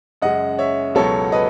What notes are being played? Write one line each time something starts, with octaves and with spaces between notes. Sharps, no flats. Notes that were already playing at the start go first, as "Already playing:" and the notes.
F#2 C#3 G#3 D#5 F#5
C#5 E5
C#2 B2 F#3 A4 C#5
B4 D#5